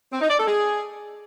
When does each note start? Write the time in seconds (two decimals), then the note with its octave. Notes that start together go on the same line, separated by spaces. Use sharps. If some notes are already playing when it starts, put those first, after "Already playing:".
0.12 C4
0.21 D#4
0.30 D5
0.39 A4
0.47 G#4